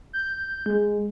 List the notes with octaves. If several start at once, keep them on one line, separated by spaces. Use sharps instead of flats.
G6
G#3